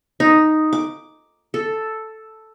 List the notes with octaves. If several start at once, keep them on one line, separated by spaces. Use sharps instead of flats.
D#4
D6
A4